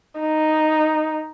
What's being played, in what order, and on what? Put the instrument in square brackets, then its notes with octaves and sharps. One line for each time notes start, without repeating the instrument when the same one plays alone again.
[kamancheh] D#4